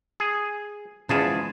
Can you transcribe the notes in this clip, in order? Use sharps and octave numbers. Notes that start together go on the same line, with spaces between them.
G#4
E2 C#3 F3 G#3 G#4 A5